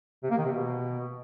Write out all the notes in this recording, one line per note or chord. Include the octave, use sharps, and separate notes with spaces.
C3
A#3
D#3
C3
B2